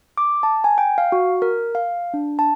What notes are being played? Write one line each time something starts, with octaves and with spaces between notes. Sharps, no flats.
D6
A5
G#5
G5
F5
F#4
A#4
F5
D4
A5